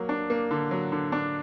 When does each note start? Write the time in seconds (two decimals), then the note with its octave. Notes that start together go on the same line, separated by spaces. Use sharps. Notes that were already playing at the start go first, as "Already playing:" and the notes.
Already playing: F#3 A#3
0.09 D4
0.30 A#3
0.51 D3
0.71 F#3
0.92 D3
1.12 D4